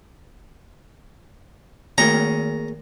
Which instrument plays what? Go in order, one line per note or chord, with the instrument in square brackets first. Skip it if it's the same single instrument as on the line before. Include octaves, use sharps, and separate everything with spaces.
[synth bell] D#3 A3 A#4 [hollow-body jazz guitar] A#3 G#4 C#5 [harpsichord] A#5